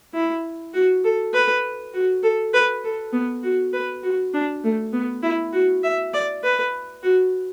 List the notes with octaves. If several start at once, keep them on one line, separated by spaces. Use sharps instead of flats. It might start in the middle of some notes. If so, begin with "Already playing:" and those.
E4
F#4
A4
B4
F#4
A4
B4
A4
B3
F#4
B4
F#4
D4
A3
B3
E4
F#4
E5
D5
B4
F#4